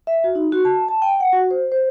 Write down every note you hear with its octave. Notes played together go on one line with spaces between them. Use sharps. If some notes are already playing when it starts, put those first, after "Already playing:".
E5
F#4
D#4
F#4
A5
A5
G5
F#5
F#4
C5
C5